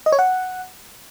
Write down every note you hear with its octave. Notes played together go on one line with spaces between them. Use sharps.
D#5
C#5
F#5